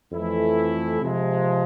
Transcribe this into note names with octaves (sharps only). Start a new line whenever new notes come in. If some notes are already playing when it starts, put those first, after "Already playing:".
F2 E3 A3 E4
C3 F3 G#3